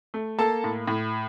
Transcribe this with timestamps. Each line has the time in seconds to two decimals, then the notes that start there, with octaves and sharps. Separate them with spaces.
0.14 A3
0.38 A#3 A4 A5
0.64 A2
0.88 A2